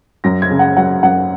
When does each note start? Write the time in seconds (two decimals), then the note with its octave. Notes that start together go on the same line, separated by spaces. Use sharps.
0.24 F#2 A#6
0.42 G#6
0.51 C#3
0.59 F#5
0.77 F#3 F#5
1.03 F#2 F#5